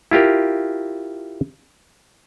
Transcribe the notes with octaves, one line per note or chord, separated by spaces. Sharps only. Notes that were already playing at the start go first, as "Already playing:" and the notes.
E4 F4 G4 A#4